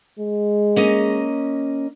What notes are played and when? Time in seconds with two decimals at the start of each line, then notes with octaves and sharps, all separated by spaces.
0.19 G#3
0.76 A#3 C#4 D#5